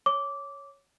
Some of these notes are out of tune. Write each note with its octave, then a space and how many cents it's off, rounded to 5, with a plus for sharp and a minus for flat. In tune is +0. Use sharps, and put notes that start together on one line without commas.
C#5 +0 D6 -15